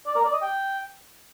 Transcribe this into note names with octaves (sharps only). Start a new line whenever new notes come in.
D5
A#4
D5
D#5
G5